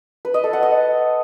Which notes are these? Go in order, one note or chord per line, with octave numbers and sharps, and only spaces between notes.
B4
D#5
A4
F#5
D#5